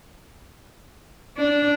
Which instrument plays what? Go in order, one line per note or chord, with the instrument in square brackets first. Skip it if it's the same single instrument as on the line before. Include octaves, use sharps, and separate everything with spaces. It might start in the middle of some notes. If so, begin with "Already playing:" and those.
[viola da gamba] D4